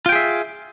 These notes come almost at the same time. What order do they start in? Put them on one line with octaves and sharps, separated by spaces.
F4 G5 G#4 E5